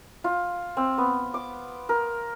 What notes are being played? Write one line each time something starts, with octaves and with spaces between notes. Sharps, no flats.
F4
C4
B3
D6
A#4